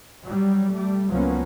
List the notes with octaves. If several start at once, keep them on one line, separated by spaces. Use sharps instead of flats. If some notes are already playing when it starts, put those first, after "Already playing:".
F#3 G3
G3 A3
C#2 F3 F#3 A#3 B3 C#4